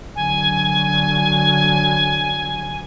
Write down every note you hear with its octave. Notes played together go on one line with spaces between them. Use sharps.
D3 F#3 G#5